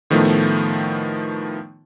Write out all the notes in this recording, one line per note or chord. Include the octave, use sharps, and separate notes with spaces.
A2 D#3 F3 A3 B3